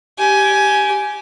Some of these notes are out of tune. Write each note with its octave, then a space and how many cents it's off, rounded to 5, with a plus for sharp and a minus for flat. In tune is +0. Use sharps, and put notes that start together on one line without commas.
G4 -10 G#5 +10